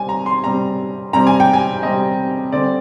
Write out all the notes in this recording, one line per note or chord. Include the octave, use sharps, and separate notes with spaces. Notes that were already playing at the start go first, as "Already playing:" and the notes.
Already playing: C3 G3 C4 G#5
A#5
C6
C3 G3 C4 A#5
C3 G3 C4 A#5
G#5
G5
G#5
C3 G3 C4 D#5
D3 G3 C4 D5